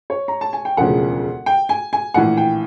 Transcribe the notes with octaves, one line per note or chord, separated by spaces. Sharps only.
C#5
A#5
A5
G#5
G5
E1 D2 C#3 F3 F#5
G5
G#5
G#5
A#1 A2 E3 F#5
G5